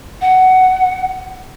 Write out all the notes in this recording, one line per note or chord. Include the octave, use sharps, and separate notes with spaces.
F#5